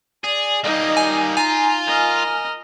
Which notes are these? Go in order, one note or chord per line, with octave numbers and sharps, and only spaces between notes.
G#4 D5
G3 A#3 D#4 D#5
G#5
F4 G#5 A#5
A#4 D#5 F6